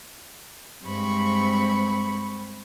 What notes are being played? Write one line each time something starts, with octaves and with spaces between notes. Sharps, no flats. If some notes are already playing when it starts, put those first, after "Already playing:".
G2 G#3 C4 B5 C#6